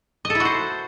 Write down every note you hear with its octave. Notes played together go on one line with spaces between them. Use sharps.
D#5
A4
E4
F#4
C5